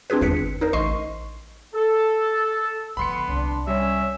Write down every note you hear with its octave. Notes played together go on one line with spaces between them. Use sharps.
C4 D4 F4 G#4 B4
G1 E2 B4 B6 C#7
D#4 A#4 C5
A1 D#5 C6 C#6 C7
A4
D3 F3 B3 B5 C6 C#7
C2 D4
G3 C#4 E5